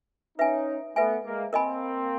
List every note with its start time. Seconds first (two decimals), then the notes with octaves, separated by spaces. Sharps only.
0.38 C#4 D#4 B4 E5 G#5
0.96 A3 B3 B4 E5 G#5
1.24 G#3 A#3
1.53 A#3 C4 A#4 D#5 G#5 B5